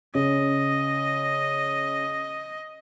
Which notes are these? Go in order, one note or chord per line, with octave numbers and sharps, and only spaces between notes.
C#3 D#5